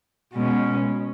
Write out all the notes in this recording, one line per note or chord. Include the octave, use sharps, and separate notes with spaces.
B2 G#3 C#4